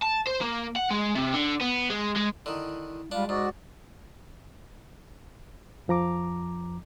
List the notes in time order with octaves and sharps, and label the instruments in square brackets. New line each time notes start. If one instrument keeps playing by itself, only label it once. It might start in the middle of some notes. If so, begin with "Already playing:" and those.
[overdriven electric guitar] A5
C5
A#3
F#5
G#3
C3
D3
B3
G#3
G#3
[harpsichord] D3 D#3 [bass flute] E4
[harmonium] G3 F4 [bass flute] G#3 [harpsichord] D4
[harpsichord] G#2 [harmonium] F#4 D5
[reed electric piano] F2 F3 A#5 D6